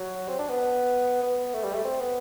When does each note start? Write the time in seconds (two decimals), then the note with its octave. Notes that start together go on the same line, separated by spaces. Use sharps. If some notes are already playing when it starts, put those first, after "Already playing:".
Already playing: F#3
0.28 C4
0.39 D4
0.49 B3
1.23 B3
1.54 A3
1.64 G3
1.74 A3
1.84 C4
2.00 B3